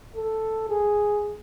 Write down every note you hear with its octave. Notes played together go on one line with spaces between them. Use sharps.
A4
G#4